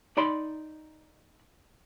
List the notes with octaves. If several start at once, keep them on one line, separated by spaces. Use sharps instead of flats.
D#4 D5 B5 C6